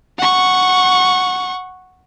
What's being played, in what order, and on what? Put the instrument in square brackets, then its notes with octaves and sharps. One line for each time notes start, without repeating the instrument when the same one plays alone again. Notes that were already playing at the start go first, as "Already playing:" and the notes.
[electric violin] F#5 C#6